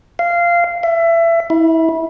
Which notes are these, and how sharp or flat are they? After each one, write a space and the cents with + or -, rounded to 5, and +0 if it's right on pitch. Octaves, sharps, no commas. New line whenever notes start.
F5 -15
E5 +25
E4 -25